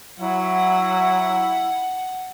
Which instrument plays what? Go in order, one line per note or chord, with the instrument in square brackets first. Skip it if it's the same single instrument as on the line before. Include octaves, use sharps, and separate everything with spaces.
[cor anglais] F#3 [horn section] E4 [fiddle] F#5